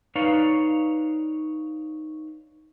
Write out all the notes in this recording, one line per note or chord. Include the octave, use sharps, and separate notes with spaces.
D#4 B4 C#5 D5 F5